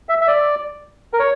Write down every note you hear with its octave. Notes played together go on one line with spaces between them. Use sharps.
E5
E5
D5
A#4
C#5